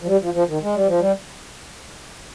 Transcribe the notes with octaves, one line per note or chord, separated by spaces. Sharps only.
F3
G3
F3
F3
D#3
G#3
G3
F3
G3